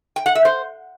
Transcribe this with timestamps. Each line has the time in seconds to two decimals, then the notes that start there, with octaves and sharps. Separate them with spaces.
0.16 G5
0.26 F#5
0.35 E5
0.45 C5